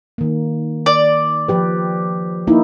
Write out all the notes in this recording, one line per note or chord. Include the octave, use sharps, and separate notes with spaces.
D#3 A#3
D5
F3 G4 B4
A#3 D#4 E4